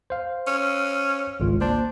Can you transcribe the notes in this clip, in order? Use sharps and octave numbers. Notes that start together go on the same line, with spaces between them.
C5 F5
C#4
G#1 C#2 F4
A#3 D4 C5 A5